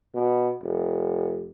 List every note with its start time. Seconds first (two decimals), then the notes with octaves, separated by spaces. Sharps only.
0.14 B2
0.63 F1